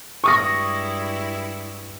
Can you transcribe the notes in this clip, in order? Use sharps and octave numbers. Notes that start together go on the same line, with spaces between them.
G2 G#3 E4 C#6 D#6 A#6